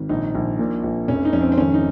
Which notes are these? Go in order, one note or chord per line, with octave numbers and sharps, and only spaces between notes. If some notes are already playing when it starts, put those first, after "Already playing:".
Already playing: G#1
A#1 D#4
A#1
A#2
A#1
F1 C#4
D#4
F2 C#4
C4
C4
G#1 C#4
D#4